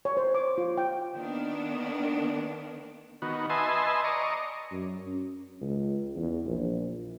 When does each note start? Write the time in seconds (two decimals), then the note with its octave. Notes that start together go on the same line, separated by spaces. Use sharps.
0.05 C#5
0.17 C5
0.35 D6
0.58 F4
0.77 G5
1.12 D#3 A#3 B3 D4
3.22 D#3 B3 F#4
3.50 B4 D#5 E5 G#5 A5 C6
4.04 D5 D#5 A#5 C#6
4.71 F#2
5.07 C#4
5.61 C#2
6.16 E2
6.46 A#1